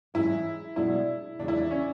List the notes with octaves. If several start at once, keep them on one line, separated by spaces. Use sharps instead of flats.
G#2 E3 G#3 C#4 E4
B2 G#3 D4 E4
E2 C#3 G#3 D4
E4
D4
C#4